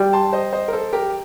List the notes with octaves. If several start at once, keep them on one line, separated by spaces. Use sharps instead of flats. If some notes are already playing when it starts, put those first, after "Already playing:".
Already playing: G3
A5 C6
C5 D#5
C5 D#5
A#4
A4 C5
G4 A#4